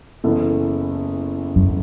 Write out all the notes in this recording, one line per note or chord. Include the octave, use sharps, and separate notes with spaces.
F#1 E2 E3 B3 A4
F#2